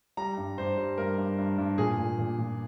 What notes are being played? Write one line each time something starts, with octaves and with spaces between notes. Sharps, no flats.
G3 A#5
G2
G2 C5
G3
G2 A#4
G2
G2
G2
A#2 G#4
A#2
A#2
A#2